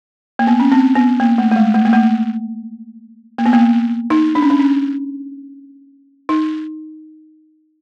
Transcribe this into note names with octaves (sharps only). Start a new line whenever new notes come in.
A#3
B3
C#4
C4
B3
A#3
A3
A3
G#3
A3
A#3
A3
A#3
B3
A#3
D#4
D4
C#4
D4
C#4
D#4